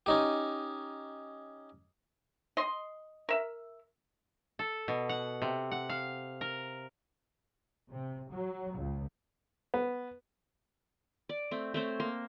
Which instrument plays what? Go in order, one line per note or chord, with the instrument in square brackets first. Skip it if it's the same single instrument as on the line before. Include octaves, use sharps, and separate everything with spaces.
[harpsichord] C#4 D#4 G4
[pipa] D#5 C6
A#4 E5
[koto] A4
B2
F#5
C3
F#5
F5
A#4
[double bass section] C3
F#3
C#2
[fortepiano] B3
[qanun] D5
A3 C4
A3 C4 C5 C#5
A#3 C6